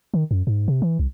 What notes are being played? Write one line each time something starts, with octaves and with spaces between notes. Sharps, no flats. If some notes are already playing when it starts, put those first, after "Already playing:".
D#3
F#2
G#2
C3
E3
C2